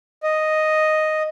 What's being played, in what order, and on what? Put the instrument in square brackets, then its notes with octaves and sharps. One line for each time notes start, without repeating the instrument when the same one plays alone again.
[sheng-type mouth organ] D#5